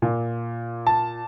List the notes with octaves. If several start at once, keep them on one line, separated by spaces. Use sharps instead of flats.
A#2
A5